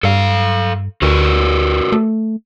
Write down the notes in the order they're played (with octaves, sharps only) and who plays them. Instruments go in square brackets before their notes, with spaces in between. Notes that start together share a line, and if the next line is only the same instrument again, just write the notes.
[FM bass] G2 [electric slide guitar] A4 F5
[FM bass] D2 [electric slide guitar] F#4 A#4 B4
[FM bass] A3